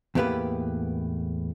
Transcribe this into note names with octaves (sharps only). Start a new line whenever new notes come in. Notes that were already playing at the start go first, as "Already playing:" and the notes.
E2 A2 A#3 B3 G4 B4